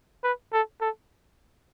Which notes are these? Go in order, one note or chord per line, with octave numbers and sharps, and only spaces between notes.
B4
A4
A4